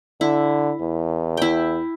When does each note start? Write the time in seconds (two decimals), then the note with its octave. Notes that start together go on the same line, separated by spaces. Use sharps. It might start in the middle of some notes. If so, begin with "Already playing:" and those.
0.21 D3 E4
0.80 E2
1.37 E4 G5